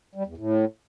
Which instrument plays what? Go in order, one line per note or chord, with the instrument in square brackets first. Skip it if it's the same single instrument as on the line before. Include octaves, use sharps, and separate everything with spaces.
[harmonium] G3
E2
A2